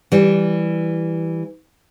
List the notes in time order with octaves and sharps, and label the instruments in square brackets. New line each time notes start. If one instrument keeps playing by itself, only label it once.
[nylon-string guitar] E3 G3